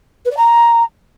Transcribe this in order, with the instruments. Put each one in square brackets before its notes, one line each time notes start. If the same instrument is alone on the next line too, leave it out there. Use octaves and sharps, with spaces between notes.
[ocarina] B4
D5
A#5